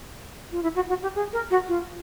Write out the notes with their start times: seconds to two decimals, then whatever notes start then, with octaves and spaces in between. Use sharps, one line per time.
0.52 F4
0.63 E4
0.75 F#4
0.89 F#4
1.02 G4
1.15 G#4
1.33 A#4
1.51 F#4
1.68 F4